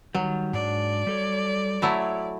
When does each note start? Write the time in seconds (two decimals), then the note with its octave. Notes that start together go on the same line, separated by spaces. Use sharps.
0.15 D#3 F#3 G3
0.53 G#2 D4 D5
1.07 G3 A4 C#5
1.82 F#3 A3 E4 C#5